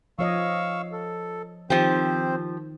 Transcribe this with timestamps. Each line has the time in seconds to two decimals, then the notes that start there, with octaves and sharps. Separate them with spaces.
0.19 F3 C#5 D#5 F5 C#6 E6
0.92 A4
1.70 D#3 F3 C4 G4 C5